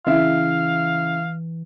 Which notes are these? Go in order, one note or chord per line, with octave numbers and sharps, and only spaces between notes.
C#3 E3 E4 E5 F5